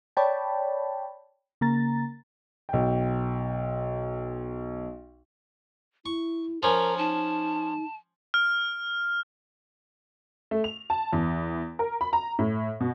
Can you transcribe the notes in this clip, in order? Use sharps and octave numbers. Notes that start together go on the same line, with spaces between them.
C#5 D5 G5 A5 B5
C#3 A#3 A#5 A6
B1 G5
E4 C#6
F3 C#4 A#4 A#5
D#4 A5
F6
A3
F7
A5
E2
A#4
B5
A#5
A2
B2